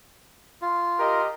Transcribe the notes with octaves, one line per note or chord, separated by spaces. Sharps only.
F4
G4 A#4 D#5